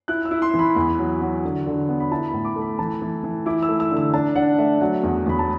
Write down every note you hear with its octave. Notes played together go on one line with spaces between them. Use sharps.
E4 F#6
E6
E4
C6
E3
B5
E2
F#3
F#3
D3
D3
B3
B5
E4 A5
B5
A2
D6
A3
B5
E3 A5
E3
E3
E4 D6
E6
A3
E6
D3
E6
D4 A5
D4 F#5
A3 E5
F#3 F#5
E2
E2 B5
A5